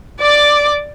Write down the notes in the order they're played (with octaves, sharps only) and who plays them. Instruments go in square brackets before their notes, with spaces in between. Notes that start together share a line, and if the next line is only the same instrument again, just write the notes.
[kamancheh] D5 D6